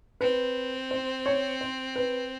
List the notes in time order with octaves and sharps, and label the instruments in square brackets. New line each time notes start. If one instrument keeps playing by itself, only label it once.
[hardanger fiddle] C4 [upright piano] B4
[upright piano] C5
C#5
C5
B4